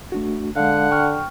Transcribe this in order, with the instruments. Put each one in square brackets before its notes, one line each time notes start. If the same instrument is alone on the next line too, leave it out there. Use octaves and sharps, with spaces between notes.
[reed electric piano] A3 D4 F#4
[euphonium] D3 [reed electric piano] G#3 F5 [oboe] F#5
[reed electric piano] G5 C#6 F6